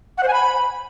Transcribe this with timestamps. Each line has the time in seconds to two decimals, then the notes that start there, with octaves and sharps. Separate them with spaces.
0.18 F#5
0.23 C5
0.28 G#5
0.33 B5